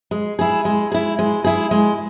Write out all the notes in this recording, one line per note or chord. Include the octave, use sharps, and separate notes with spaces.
G#3
E4 G#4
G#3
E4 G#4
G#3
E4 G#4
G#3